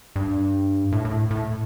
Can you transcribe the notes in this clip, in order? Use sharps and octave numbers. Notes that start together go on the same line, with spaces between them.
G2
A2
A2
A2